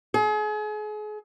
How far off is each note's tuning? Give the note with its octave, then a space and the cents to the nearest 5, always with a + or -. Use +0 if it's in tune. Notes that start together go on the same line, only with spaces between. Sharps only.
G#4 +35